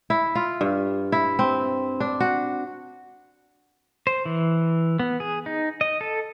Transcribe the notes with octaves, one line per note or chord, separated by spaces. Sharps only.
E4
F4
G2
E4
C4
D4
F#4
C5
E3
B3
G#4
D#4
D#5
A4